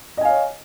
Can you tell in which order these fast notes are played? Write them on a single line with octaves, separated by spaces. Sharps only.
D#5 G#5 F5 C#5